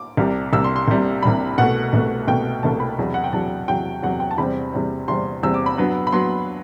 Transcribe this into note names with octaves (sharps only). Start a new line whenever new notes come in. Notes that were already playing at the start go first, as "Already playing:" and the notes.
Already playing: D6
C2 C3 G3
C2 C3 G3 E6
C6
C6
C2 C3 G3
C2 C3 G3 B5
C2 B2 A3 F#5
C2 B2 A3
C2 B2 A3 G5
C2 B2 A3 A5
B5
E2 C3 F#3
F#5
G5
E2 C3 F#3 A5
E2 C3 F#3 G5
E2 C3 F#3 F#5
G5
A5
E2 C3 G3 C4 B5
E2 C3 G3 C4
E2 C3 G3 C4 C6
E2 C3 G3 C4 E6
D6
B5
G2 F#3 B3
B5
G2 F#3 B3 C6